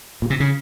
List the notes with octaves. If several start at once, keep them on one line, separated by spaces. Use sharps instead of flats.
A#2
C3
C#3